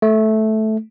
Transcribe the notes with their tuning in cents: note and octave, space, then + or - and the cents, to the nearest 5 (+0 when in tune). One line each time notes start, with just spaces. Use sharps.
A3 -10